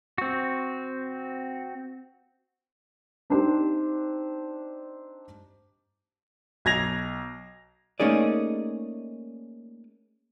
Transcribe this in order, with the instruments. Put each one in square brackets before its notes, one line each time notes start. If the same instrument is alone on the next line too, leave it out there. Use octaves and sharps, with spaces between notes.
[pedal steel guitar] C4 F#4
[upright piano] C4 D4 D#4 G4 C5
B1 G#6 A#6 F7
[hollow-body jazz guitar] A3 A#3 C#4 D#4 G#4 D5